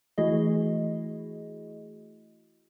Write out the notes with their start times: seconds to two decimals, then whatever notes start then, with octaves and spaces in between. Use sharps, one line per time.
0.18 E3 A3 E4 F#4 G#4 D#5